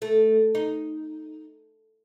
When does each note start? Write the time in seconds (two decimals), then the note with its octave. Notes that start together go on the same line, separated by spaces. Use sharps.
0.02 A3
0.55 D#4